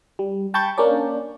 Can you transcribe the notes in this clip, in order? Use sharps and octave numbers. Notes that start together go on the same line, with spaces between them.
G3
G5 A5 B5 C#6 G6 A6
A#3 C#4 D4 D5